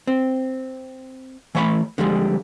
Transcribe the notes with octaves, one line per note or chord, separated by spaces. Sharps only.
C4
E3 A3 C#5 F#5 B5
D3 F3 G3 G#3